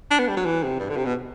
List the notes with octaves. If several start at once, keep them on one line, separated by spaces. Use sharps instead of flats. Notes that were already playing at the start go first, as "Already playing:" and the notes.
D4
B3
G3
F#3
E3
C3
G2
D3
C3
B2